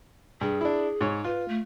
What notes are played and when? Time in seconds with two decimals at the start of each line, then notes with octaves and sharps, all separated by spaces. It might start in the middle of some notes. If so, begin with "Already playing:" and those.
0.41 G2 G#4
0.61 D4 E4
1.01 G#2 C#5
1.25 F4 B4
1.49 A3